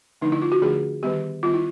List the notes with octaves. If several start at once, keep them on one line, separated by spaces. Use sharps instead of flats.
D3 F3 A3 D4 D#4
E4
F4
F#4
D3 F3 A3 D4 G#4
D#3 G3 B3 G4
D#3 G3 B3 F4
E4